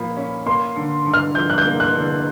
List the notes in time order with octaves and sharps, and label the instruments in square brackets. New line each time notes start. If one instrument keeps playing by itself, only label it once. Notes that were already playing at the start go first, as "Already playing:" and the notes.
Already playing: [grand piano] A#2 F3 A#3 [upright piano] B5
[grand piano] C#4
[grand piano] A#3 [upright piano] C6
[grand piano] D3
D3
[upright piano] F6
[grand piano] F3 [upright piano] G6
[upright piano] F#6
G6
[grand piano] A#3
[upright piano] F#6
[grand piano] D3